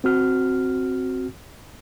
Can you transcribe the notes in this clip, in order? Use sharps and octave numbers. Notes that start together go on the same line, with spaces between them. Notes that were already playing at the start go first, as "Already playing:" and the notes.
C4 F#4 F6